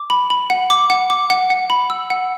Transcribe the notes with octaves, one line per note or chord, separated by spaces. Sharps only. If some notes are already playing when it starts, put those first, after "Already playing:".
Already playing: D6
B5
B5
F#5
D6
F#5
D6
F#5
F#5
B5
E6
F#5